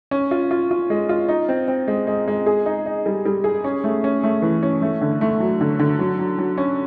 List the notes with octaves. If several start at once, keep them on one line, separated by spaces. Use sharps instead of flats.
C#4
F4
F4
F4
G#3
F4
D#4
C4
C4
G#3
G#3
G#3
G#4
D#4
D#4
G3
G3
G#4
C#4
A3
C#4
A3
E3
C#4
A3
D3
A3
F#3
D3
D3
F#3
F#3
F#3
C#4